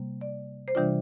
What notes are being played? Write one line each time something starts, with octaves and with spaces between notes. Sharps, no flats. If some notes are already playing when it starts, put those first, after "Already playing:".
Already playing: C3 G3 A#3
D5
C5
C3 E3 G3 D4 F4 D5